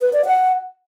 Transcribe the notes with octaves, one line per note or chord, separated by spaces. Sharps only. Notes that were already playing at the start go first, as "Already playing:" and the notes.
B4
D5
F#5